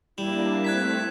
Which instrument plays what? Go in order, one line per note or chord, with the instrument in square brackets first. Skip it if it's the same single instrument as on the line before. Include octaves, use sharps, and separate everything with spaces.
[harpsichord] G3 [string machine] A#3 D4 [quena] E4 [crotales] E7
[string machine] A3 C4 [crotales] F#6 G#6 B6